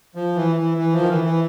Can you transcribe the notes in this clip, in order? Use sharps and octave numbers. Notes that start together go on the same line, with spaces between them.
F3
E3
E3
E3
F3
D#3
E3
E3